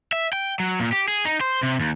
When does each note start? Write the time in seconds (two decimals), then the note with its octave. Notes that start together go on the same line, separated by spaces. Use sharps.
0.13 E5
0.33 G5
0.60 F#3
0.80 A#2
0.92 G4
1.08 G#4
1.25 D#4
1.41 C5
1.63 C3
1.80 D#2